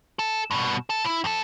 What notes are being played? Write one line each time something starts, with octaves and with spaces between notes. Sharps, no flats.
A4
G2 B2
A4 A5
E4
F2 A4